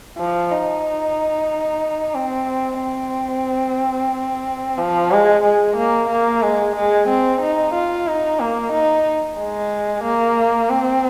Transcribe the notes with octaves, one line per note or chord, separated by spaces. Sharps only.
F3
D#4
C4
C4
F3
G#3
G#3
A#3
A#3
G#3
G#3
C4
D#4
F4
D#4
A#3
D#4
G#3
A#3
C4